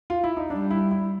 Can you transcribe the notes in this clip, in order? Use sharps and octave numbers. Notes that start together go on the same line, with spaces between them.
F4
E4
D#4
G3 D4
E4
E4